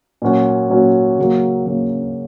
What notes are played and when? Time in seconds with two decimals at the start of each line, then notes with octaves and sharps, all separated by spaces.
0.22 A#2 F#3 C#4 F#4
0.70 A#2 F#3 C#4 F#4
1.19 C#3 F#3 A#3 C#4
1.67 C#3 F#3 A#3 C#4